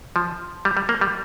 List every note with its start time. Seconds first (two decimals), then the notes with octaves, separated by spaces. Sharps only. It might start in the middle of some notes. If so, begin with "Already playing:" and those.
0.16 F3
0.65 G3
0.77 G3
0.89 A#3
1.01 G3